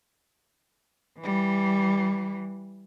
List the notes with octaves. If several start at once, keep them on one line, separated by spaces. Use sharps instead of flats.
E3 G3